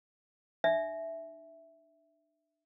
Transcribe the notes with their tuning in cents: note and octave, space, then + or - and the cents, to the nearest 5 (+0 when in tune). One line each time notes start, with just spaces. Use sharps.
D4 +35 E5 +0